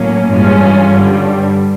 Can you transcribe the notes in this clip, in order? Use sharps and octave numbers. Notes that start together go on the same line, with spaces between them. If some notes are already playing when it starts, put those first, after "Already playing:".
Already playing: A2 F#3 A#3 C#4
G2 E3 G#3 C#4 F4
G2 D3 G3